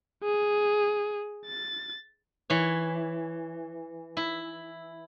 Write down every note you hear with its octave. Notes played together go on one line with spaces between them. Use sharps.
G#4
A6
E3 C#5
E4